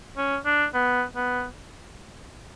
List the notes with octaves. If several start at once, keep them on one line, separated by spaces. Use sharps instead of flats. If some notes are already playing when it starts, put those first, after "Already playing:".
C#4
D4
B3
B3